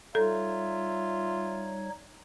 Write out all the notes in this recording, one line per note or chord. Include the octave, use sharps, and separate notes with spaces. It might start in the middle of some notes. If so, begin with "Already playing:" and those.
G3 D#4 F4 A4 C#5 E5